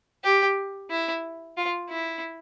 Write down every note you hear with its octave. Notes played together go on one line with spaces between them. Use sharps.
G4
E4
F4
E4